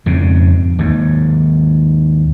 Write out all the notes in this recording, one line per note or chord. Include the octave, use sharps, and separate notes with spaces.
F2 G#2 C#3
D#2 G#2